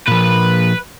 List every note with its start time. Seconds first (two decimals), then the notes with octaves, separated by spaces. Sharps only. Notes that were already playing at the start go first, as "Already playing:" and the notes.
0.08 A#2 F3 B4